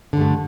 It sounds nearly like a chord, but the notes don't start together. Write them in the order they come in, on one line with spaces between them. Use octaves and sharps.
D3 G2 A3